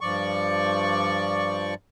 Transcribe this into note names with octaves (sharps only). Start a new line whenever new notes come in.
G2 F3 D5 C#6